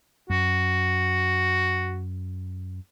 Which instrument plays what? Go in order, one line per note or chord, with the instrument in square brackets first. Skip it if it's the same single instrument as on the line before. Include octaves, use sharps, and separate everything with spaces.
[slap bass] F#2 [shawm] F#4